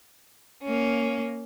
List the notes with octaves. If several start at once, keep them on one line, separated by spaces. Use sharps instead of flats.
A#3 C#4